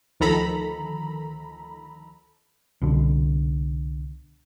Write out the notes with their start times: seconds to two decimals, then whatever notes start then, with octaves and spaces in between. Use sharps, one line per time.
0.20 D2 D#3 F3 A4 A#5 B5
2.81 C2 B2 D3